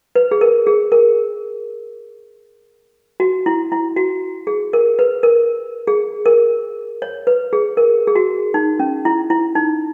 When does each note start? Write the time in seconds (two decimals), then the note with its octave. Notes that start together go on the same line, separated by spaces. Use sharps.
0.16 B4
0.31 G#4
0.41 A#4
0.67 G#4
0.92 A#4
3.20 F#4
3.46 E4
3.72 E4
3.97 F#4
4.47 G#4
4.73 A#4
4.99 B4
5.23 A#4
5.87 G#4
6.26 A#4
7.02 C#5
7.27 B4
7.53 G#4
7.77 A#4
8.07 G#4
8.15 F#4
8.54 D#4
8.79 C#4
9.05 E4
9.30 E4
9.55 D#4